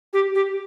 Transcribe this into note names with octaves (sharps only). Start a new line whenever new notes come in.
G4
G4